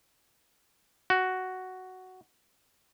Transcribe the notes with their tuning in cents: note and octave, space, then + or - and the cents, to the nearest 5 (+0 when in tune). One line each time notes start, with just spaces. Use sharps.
F#4 +5